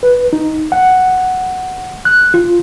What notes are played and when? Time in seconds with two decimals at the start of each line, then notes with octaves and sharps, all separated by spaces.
0.03 B4
0.33 D#4
0.72 F#5
2.05 F#6
2.34 F4